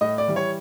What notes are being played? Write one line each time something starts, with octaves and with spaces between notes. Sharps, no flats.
A2 D#5
D5
E3 G3
C#5